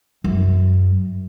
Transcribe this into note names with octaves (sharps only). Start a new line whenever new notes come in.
F#2